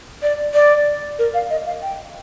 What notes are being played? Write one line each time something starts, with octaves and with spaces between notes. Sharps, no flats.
D5
D5
A#4
F5
D#5
F5
G5